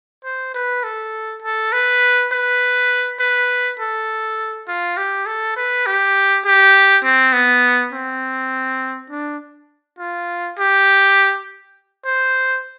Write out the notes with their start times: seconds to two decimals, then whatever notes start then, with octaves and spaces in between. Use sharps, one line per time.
0.24 C5
0.55 B4
0.84 A4
1.43 A4
1.72 B4
2.32 B4
3.20 B4
3.80 A4
4.68 F4
4.97 G4
5.26 A4
5.56 B4
5.86 G4
6.45 G4
7.04 C4
7.33 B3
7.93 C4
9.11 D4
9.99 F4
10.58 G4
12.06 C5